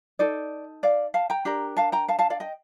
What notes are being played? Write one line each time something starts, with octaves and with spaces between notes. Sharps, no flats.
D#4 A4 D5
D5 F5
F5 A5
G5 A#5
D4 G4 A#4
F5 A5
G5 A#5
F5 A5
F5 A5
D5 F5
D#5 G5